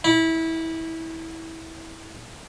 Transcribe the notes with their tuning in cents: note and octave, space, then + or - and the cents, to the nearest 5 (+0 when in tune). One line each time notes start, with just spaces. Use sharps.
E4 -20